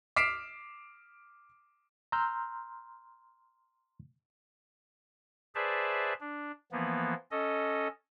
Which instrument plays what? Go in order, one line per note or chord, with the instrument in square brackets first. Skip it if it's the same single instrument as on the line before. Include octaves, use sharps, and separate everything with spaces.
[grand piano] D6 F6 B6 C7 D7 E7
[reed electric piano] A#5 C6 E6 F6 G6
[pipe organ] G#4 B4 C5 D5 E5 A5
D4
E3 F3 A#3 B3
C#4 A4 D#5